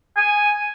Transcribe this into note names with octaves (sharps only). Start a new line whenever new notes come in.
G#5